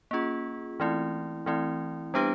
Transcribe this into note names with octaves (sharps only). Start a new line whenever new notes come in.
A#3 C#4 F4 G#4
E3 A3 C4 E4
E3 A3 C4 E4
G3 B3 D4 G4 B4